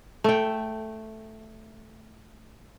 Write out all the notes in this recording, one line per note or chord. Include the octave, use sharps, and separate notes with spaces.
A3 G5